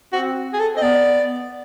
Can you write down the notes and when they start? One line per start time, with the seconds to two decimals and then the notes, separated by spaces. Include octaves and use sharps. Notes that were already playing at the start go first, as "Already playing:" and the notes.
0.13 C4 F#4
0.54 G#4
0.59 A4
0.74 C4
0.77 D#5
0.82 B3 D5